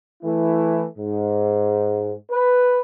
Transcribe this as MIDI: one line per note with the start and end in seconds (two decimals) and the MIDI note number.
0.23 0.85 52
0.23 0.85 57
0.23 0.85 64
0.98 2.12 44
2.30 2.80 71